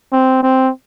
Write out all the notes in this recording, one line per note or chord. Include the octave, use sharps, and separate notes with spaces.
C4
C4